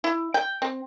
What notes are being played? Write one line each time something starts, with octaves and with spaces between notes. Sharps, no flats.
E4
G5
C4